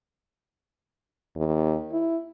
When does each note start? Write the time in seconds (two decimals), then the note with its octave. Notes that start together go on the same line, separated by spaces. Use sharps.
1.36 D#2
1.92 E4